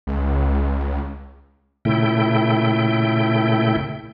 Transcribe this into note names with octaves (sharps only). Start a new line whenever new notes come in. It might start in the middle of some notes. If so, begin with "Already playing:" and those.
C#2
A#2 C#3 A3 E4 G5